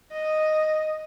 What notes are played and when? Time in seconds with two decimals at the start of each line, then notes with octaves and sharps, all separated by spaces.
0.11 D#5